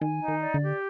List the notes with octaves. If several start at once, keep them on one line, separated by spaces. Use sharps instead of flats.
D#3 G#5
D#4
D#3
D5
D3
G4